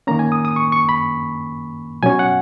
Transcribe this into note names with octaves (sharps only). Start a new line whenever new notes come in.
D#3 A#3 C#4 A#5
G#5
D#6
D#6
C#6
C#6
B5
B2 F#3 C#4 G#5
F#5